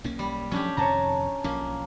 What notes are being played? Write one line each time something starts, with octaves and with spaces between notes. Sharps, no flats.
B1 A#3 C#4
G3
F3 F#3 A3 C#4 D4 G4
F2 C3 D#3 C#5 A5 A#5
B1 F3 A#3 C#4